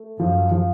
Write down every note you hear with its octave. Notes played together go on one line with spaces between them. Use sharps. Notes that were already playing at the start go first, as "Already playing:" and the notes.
Already playing: A3
F#2 F3
F3